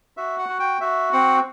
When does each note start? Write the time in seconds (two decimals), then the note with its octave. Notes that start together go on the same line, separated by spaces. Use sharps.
0.17 F#4 E5
0.39 F#5
0.49 F#4
0.60 G5
0.81 F#4 E5
1.13 C4 F#5